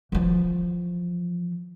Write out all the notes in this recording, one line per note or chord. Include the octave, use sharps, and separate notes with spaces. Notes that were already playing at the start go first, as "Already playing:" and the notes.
E3 F3